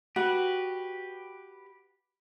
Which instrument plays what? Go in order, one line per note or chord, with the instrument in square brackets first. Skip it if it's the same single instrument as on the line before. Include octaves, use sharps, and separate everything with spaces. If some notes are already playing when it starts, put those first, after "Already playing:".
[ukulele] F#4 [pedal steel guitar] G4 B4